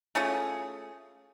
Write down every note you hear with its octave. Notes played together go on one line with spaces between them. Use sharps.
A3 C#4 F4 G#4